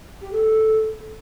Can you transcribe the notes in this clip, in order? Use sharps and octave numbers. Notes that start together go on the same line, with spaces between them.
G4
A4